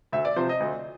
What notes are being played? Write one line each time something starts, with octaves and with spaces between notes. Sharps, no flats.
D2 E5
D5
C3 F3 C5
D#5
D2